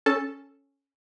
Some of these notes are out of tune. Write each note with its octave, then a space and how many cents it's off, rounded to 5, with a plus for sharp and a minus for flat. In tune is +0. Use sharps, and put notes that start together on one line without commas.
C#4 +0 A4 +0 A5 +0